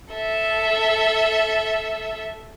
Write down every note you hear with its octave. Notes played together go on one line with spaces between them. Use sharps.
A4 E5